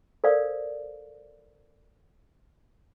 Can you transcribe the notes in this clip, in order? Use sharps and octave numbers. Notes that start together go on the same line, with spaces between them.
A4 A#4 C5 D5 F5